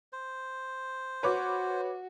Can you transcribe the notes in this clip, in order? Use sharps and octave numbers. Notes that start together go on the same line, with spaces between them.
C5
F#4 B4 C#5 D6